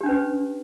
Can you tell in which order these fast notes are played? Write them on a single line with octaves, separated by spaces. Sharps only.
G4 D4 C#4 B4